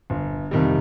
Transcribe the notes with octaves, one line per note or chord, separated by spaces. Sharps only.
G1
F2 C3 D#3 G3